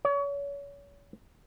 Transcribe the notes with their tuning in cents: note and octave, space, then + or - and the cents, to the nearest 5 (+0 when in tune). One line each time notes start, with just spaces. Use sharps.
C#5 +35